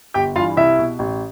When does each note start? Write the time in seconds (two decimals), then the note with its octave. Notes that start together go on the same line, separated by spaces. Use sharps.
0.14 G1 G4 G5
0.35 G2 E3 F4 F5
0.57 C2 E4 E5
0.79 B2
0.99 A1